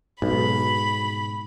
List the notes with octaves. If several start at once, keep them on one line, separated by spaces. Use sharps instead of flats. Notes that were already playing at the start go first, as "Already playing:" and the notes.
B1 G#2 B2 B5